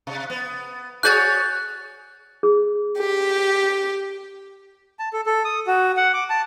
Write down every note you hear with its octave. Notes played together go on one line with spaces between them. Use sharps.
C3
B3
F#4 G#4 C#5 F#6 G6 A6
G#4
G4
A5
A4
A4
D#6
F#4
F#5
D6
A5